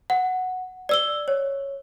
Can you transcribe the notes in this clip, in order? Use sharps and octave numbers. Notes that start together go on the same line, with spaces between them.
F#5
D5 E6 G7
C#5